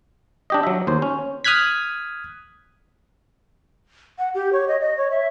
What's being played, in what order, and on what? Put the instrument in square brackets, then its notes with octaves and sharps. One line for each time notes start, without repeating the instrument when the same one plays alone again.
[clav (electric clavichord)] D4 G4 D#5
F#3 E5
D#2 C5
C#4
[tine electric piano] D#6 F6 F#6 G#6 B6
[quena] F#5
G4
C#5
D#5
D#5
C#5
E5